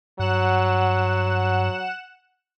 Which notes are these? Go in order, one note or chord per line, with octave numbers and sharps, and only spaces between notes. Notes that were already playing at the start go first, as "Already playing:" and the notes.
G2 F#3 F#5 F#6 E7